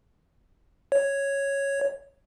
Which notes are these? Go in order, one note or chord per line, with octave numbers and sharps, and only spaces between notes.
C#5